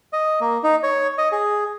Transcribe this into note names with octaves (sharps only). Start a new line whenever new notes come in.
D#5
A#3
D#4
C#5
D#5
G#4